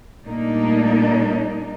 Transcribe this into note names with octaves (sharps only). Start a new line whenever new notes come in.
A#2 G3 A3 A#3 D4 D#4